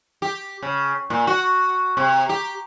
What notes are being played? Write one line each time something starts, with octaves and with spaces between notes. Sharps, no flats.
G4
C#3
A#2
F#4
C3
G4